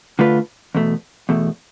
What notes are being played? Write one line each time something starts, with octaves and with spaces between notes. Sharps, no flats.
D3 A3 D4 F4 B4
E2 B2 A3
E2 B2 A3